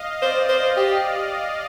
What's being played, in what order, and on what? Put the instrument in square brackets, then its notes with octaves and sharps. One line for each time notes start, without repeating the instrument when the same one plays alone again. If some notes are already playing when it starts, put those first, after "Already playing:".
Already playing: [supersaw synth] D#5 F5
[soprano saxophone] C5 [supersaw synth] D5
[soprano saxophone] C5
G4